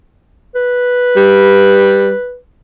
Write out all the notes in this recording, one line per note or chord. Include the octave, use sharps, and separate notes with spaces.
B4
G3